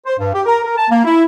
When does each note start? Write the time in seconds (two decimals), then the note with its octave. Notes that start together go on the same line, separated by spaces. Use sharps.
0.05 C5
0.18 G2
0.33 G4
0.45 A#4
0.64 A#4
0.77 A5
0.90 A#3
1.03 E4